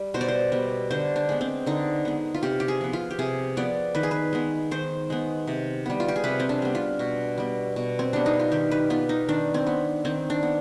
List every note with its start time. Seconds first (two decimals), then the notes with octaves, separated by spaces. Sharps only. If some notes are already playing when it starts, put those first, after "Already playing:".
Already playing: G3
0.14 B2 C5
0.21 D5
0.28 C5
0.52 G3 B3
0.91 D3 C5
1.16 D4
1.29 G#3 B3
1.41 C4
1.66 D3 D#4
2.05 G#3 B3
2.34 F4
2.43 C3 G4
2.60 G4
2.68 G#4
2.81 F3 B3
2.93 F4
3.10 G4
3.19 C3 G#4
3.57 F3 B3 D5
3.95 D#3 B4
4.03 G#4
4.11 B4
4.33 G#3 B3
4.71 D#3 C5
5.10 G#3 B3
5.47 C3
5.86 G3 B3
6.00 F4
6.08 G4
6.16 G#4
6.24 C3 B4
6.40 C4
6.49 D4
6.62 G3 B3
6.75 F4
6.99 B2
7.38 G3 B3
7.76 B2
7.99 C4
8.13 G3 B3 D4
8.26 D#4
8.40 F4
8.52 D#3 G4
8.71 B4
8.90 B3 F4
9.09 D#4
9.28 D#3 D4
9.54 C4
9.67 B3
10.05 D#3 C4
10.30 D4
10.43 B3